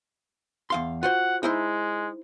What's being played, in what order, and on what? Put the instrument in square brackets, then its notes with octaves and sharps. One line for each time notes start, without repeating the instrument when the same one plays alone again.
[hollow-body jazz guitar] E2 F5 C6
[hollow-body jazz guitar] F4 F#4 C5 [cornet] F#5
[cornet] G#3 [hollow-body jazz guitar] D#4 E4 C5